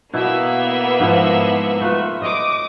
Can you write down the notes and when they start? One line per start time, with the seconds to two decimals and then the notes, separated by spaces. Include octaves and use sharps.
0.14 B2 A#3 B3 E4 E5
1.00 G#2 F3 E4
1.81 A3 F4 B4
2.22 D#5 D6 D#6